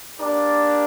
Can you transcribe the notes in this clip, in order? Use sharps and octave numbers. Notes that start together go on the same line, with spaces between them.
A#3 D4 G4 A#4 D5